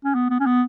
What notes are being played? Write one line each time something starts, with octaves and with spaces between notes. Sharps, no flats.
C#4
B3
B3
C#4
B3